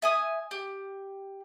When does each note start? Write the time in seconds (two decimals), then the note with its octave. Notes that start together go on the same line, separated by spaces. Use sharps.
0.02 E5 G#5 D#6
0.51 G4